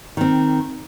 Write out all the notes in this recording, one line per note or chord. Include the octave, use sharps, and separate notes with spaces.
D#3 C4